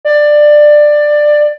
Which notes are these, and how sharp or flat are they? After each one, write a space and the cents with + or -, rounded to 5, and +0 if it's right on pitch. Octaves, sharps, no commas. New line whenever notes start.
D5 +15